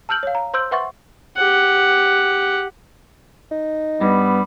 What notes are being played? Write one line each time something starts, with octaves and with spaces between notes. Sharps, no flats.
A5 E6 F6 G6 F#7
C#5 F5
A#5
C5 C6 E6 G6
B4 E5 F#5 C6 C#6 A6
G4 F#5
D#4
G2 G3 B3